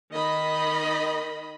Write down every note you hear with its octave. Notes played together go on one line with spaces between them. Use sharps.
D#3 D#5 B5